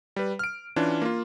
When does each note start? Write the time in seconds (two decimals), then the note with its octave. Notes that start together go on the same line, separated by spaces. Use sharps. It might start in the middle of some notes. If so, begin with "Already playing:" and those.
0.16 G3 B4
0.39 F6 D7
0.76 E3 C#4 D4 F4
1.02 A#3 F4